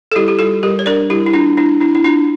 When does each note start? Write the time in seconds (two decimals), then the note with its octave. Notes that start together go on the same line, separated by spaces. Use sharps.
0.12 A4
0.15 G3 E4 G4
0.28 G4
0.39 G3 F4 A4
0.63 G3 G4 A#4
0.79 C#5
0.86 D4 A#4 D5
1.10 G3 E4 G4
1.26 E4
1.33 D4 F4
1.57 D4 E4
1.81 D4 E4
1.95 E4
2.04 D4 F4